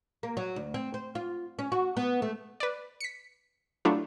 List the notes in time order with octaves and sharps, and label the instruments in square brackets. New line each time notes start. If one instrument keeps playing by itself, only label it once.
[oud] A#3
F#3
D2
C4
C5
F4
C#4
F#4
B3
A3
[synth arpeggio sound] B4 D5
B6 C#7
F#3 A3 D4 E4 F4